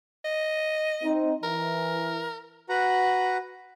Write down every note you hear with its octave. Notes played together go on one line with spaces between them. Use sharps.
D#5
C4 D#4
E3 A#4
F#4 B4 F#5 A#5